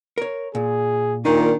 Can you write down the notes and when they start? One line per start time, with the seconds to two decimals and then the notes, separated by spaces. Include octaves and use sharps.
0.18 A#4 C#5
0.55 A#2 G#4
1.25 A#2 D#3 D4 D#4